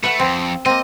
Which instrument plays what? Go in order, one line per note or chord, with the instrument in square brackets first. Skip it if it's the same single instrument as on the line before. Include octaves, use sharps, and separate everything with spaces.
[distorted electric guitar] A3 [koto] B4 F#5
[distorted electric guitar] F2 [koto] C4
[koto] A#3 C4 [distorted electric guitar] D#5